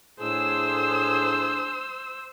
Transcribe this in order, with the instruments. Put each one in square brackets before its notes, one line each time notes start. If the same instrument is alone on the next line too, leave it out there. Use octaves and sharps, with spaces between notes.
[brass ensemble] A2 D4 G#4 [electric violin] C5 E6